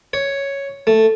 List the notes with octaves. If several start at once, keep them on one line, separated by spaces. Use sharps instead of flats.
C#5
A3